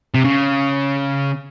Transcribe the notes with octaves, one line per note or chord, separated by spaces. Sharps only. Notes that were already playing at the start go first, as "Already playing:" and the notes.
C3
C#3